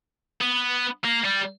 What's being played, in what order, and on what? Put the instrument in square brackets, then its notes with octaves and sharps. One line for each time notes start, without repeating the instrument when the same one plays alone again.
[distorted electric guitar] B3
A#3
G3